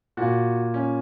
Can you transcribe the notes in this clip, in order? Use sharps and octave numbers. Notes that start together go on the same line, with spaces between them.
A#2 F#4
C#4